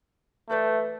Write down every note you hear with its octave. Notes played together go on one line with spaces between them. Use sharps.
E2 A3 B4 D5